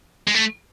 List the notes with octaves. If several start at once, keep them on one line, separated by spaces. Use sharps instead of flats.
G#3
A3